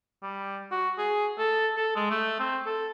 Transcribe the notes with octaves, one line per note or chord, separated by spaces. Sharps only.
G3
F#4
G#4
A4
A4
G#3
A3
C4
A4